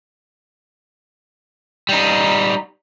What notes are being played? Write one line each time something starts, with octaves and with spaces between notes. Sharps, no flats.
G3 D#4